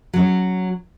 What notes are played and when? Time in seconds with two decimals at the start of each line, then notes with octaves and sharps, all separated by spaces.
0.13 F#3 C#4